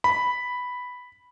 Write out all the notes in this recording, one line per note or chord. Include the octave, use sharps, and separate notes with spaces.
B5